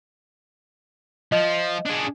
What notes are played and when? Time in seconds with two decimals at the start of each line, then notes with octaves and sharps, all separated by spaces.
1.32 F3 D#5
1.86 D4 G#4